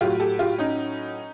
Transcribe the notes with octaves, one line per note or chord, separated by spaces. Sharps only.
A2 F#3 F4 G4
G4 A4
F4 G4
C#4 D#4